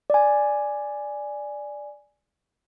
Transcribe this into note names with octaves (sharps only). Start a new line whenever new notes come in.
D5 G#5